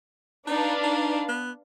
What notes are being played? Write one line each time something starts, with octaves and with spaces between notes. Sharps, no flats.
D4 D#4 B4 F5
D#4
B3